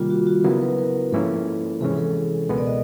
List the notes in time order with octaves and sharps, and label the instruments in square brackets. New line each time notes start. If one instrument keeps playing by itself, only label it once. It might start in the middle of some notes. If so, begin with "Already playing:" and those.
Already playing: [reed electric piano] C3 D#3 G3 A#3 [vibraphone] F4
[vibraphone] F#4
F#4
[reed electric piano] C#3 F#3 B3 E4 [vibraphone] A#4
[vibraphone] B4
A#4
[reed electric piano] G#2 F3 A#3 C#4 E4 [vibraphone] A4
[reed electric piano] C3 E3 G#3 C#4 [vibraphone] G#4
[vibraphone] A4
[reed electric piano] C#2 B2 G#3 B3 [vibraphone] A#4
[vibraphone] D5
D#5